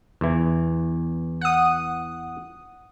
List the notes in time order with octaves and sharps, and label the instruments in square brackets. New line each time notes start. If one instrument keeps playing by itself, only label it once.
[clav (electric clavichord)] E2 E3
[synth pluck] F#5 D#6